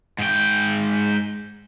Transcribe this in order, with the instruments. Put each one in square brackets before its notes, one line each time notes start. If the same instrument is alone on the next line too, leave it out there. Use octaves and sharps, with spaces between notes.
[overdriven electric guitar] G#2 G5